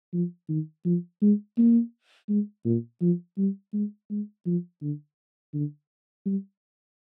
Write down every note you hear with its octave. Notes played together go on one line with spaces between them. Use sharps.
F3
D#3
F3
G#3
A#3
G#3
A#2
F3
G3
G#3
G#3
F3
D3
D3
G3